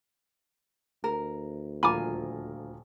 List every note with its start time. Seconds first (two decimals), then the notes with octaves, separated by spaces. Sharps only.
1.04 D2 A#4
1.83 D#1 F3 F4 A#4 G#5 A#5 B5 D6